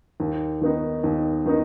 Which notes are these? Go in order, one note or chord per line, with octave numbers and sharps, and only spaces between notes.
D#2
D#3 B3 D#4
D#2
D#3 B3 D#4